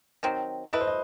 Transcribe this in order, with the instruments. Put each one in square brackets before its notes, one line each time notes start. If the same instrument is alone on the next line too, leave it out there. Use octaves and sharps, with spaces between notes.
[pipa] D#3 F#3 C4
[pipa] A3 E4 B4 [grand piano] D#5
[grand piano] C5
D#5